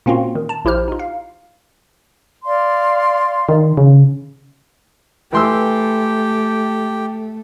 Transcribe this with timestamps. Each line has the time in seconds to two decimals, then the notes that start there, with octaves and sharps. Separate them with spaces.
0.06 A#2 A#3 C4 C#4 F4 F#4
0.35 D#3
0.49 A5
0.65 A#1 E4 G4 C5 F6
0.88 D#4 F4
0.99 F5
2.45 D5 F5 C6
3.49 D#3
3.77 C#3
5.33 E3 A3 G4 G5 C6 E6